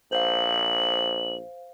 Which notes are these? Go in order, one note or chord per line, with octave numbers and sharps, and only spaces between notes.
A#1 C5 F5 F#7